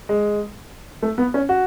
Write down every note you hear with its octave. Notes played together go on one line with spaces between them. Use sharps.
G#3
A3
B3
C#4
F#4